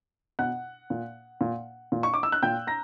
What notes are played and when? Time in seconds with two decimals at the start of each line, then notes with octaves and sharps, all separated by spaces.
0.39 B2 F#5 F#6
0.90 A#2
1.41 A#2
1.92 A#2
2.03 C#6
2.14 D6
2.23 E6
2.32 F#6
2.43 A#2 G5 G6
2.67 A#5 A#6